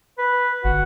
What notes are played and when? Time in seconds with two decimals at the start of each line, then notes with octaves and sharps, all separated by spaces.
0.18 B4
0.64 G1 F#4